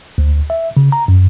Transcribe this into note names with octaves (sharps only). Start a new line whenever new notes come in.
D2
E5
C#3
A#5
F#2